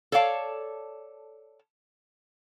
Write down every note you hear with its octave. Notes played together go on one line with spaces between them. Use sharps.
A4 C#5 D5 F5 A5